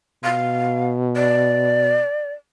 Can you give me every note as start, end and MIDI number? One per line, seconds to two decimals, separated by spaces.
0.24 2.01 47
0.24 0.88 77
1.16 2.32 74